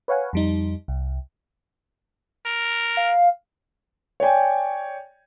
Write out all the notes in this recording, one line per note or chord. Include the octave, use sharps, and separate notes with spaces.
B4 C#5 F5 F#5 G#5
F2 G3 D#4
C2
A#4
F5
C#5 D5 G5 G#5